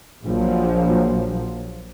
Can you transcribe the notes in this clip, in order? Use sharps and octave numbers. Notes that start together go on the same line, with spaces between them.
A#1 F3 F#3